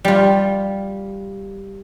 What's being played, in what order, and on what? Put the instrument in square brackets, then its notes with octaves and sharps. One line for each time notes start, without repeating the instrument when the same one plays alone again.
[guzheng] G3 F4